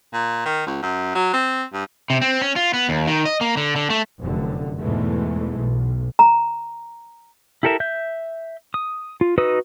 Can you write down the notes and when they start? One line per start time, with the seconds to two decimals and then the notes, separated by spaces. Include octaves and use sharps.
0.13 A#2
0.46 D#3
0.67 C#2
0.82 F#2
1.15 F#3
1.33 C4
1.73 G2
2.10 C3
2.21 C4
2.41 C#4
2.56 F4
2.73 B3
2.89 D#2
3.07 D#3
3.25 D#5
3.41 A#3
3.57 D3
3.76 D3
3.90 A3
4.19 F1 F#2 D3
4.78 E2 G#2 B2 E3 G#3 A3
5.56 B1
6.19 A#5
7.63 E4 G4 A4 A#4 E5
7.80 E5 G6
8.74 D#6
9.21 F4
9.38 D#4 F#4 B4 D#6 E6